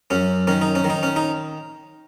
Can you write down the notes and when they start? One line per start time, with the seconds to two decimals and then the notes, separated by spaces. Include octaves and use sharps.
0.10 F#2 C#4
0.47 D#3 C#4
0.61 D#4
0.75 C#4
0.84 D#3
0.90 D#4
1.03 C#4
1.16 D#4